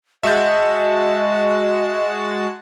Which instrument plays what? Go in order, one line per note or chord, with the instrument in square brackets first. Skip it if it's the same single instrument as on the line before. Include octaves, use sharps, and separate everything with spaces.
[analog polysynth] G#3 F#4 A5 [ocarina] D#5 [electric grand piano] E5 G6